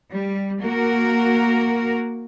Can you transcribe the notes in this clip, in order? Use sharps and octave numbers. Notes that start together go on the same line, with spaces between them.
G3
A#3 F#4 A#4